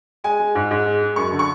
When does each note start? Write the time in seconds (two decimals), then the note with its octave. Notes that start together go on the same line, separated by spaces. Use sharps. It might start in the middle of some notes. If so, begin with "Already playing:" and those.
0.24 G#3 G#5
0.39 G#3
0.55 G#2
0.71 G#2
0.86 G#3
1.01 G#3
1.16 F#2 C#6
1.32 D3
1.39 C#6